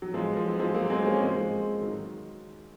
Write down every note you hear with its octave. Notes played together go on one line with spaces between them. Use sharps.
F#3
F3 G#3
F3
F#3
F3 G#3
F#3 A#3
G#3 C4
A#3 C#4
G#3 C4
F3 G#3
D#3 F#3